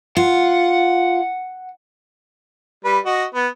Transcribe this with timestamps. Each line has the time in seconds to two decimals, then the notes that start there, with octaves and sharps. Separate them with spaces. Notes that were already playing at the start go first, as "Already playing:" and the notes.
0.17 F4 F#5
2.84 G3 B4
3.05 F#4 D#5
3.35 B3